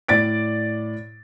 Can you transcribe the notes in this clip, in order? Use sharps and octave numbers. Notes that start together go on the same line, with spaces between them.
A2 D5 A6 D7